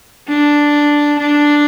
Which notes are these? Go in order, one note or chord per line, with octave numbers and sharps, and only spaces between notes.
D4
D4